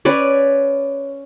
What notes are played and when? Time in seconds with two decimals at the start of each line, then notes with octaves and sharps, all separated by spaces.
0.05 C#4 B4 C#5 D5